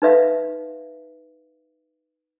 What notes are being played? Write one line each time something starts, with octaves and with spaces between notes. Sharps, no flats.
D#4 B4 E5 F5